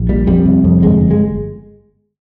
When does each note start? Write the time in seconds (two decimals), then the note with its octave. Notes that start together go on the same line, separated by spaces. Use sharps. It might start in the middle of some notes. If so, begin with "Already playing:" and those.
Already playing: A#1
0.09 A#2 G3
0.27 F2 G3
0.46 C3
0.64 F2
0.82 G1 G#3
1.01 G1
1.11 G#3